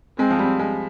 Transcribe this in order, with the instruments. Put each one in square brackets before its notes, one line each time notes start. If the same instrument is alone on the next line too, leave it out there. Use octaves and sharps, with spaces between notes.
[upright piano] G#3 [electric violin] C4
[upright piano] F3
G3
G#3